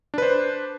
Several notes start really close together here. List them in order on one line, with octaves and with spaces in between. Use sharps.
D4 B4 C5